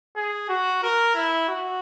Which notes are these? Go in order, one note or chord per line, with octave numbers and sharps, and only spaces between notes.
G#4
F#4
A#4
E4
F#4